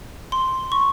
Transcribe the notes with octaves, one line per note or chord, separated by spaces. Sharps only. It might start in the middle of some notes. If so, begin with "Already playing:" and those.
C6
C#6